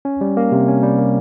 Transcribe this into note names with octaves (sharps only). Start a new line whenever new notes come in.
C#4
G3
A#3
C3
C#4
G3
A#3